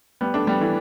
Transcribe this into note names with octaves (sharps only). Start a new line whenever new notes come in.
G3 B3
A3 D4
G3 B3
E3 A3